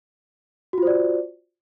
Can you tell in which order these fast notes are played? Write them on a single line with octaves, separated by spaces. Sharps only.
F#4 F4 C5 D5